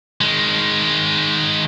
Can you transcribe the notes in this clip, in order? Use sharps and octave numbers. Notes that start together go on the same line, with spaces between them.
D#3 G#3